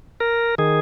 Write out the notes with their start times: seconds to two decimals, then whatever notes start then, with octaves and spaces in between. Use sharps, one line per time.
0.20 A#4
0.58 D#3 G#4